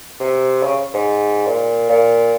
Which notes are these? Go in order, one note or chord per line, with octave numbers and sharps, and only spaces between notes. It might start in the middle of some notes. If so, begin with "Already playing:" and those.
C3
C#3
G#2
A#2
A#2